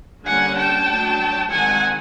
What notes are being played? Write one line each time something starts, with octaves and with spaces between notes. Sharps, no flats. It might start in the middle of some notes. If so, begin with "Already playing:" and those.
D3 G3 A#3 C#4 F#5 G#5
G5 A5
F#3 A3 D4
D#3 G#3 C4 F#5 G#5